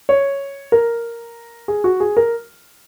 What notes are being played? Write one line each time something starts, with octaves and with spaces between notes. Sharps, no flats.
C#5
A#4
G#4
F#4
G#4
A#4